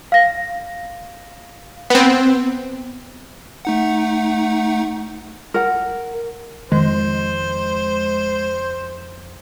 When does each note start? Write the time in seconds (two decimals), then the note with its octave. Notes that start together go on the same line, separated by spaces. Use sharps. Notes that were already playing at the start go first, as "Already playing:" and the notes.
0.12 F5 A#6
1.90 B3 C4
3.65 A3 D#4 F#5
5.54 A#4 F#5
6.72 F2 D#3 G#3 C5